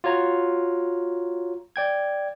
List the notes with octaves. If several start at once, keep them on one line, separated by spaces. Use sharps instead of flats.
F4 F#4 C#5 A#5
D5 G5 G#6